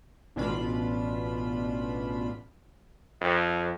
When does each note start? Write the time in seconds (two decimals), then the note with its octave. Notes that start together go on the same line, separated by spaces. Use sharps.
0.36 A1 B2 D4 F4 B5
3.21 F2